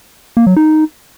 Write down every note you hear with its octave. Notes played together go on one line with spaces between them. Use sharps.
A#3
F#3
D#4